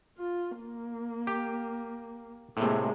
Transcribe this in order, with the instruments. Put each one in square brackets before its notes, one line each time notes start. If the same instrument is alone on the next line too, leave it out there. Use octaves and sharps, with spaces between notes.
[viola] F4
A#3
[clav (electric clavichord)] G4
[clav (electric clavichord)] A2 C3 [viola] G#3 A#3